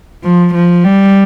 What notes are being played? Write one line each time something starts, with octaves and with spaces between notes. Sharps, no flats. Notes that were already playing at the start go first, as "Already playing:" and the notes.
F3
F3
G3